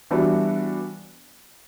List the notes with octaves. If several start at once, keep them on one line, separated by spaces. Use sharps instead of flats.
E3 G3 B3 D4 F#4